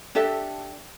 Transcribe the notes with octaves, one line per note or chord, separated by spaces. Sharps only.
D4 G4 A4 E5